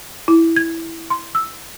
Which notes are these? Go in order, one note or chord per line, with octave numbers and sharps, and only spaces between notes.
E4
G#6
C6
E6